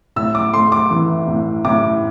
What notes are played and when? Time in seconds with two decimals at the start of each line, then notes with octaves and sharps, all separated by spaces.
0.16 A2 E6
0.35 D6
0.53 A3 C6
0.72 D6
0.91 E3
1.28 A2
1.65 A2 D6